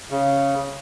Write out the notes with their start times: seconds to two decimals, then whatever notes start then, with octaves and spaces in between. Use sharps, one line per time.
0.11 C#3